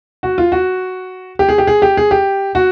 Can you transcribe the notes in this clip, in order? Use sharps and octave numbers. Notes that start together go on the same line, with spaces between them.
F#4
F4
F#4
G4
G#4
G4
G#4
G4
G#4
G4
F#4